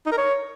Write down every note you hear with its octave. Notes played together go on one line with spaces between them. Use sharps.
D#4
A#4
C#5